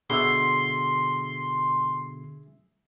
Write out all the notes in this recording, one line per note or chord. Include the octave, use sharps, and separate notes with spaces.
B2 D3 G#4 E5 C6